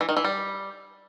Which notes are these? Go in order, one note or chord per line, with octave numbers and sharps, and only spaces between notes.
E3
D#3
E3
G3